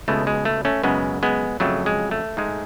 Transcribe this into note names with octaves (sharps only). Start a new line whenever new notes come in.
C#2 B2 G#3 A3
G#3
A3
A3 C#4
F#2 C#3 G#3 B3
G#3 B3
F2 C#3 F#3 A3
G#3
A3
G#2 G#3